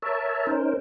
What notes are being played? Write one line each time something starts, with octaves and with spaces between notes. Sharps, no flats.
A#4 C#5 E5 A5
C#4 D#4 A#4 C5